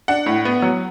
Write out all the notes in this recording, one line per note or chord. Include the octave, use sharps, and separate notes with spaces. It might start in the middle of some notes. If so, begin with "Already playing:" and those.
D4 F#5
A2
B3
F#3